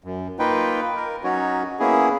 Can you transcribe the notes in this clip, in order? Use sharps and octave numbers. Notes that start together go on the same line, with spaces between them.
F#2
A#3 D#4 F4 B4 G5
A#4
F#3 C#4 D#4 F#4 C#5
A#3 B3 C#4 E4 G#4